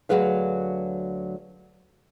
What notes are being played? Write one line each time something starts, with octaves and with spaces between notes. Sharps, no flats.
D2 E3 F#3 G#4 B4 F5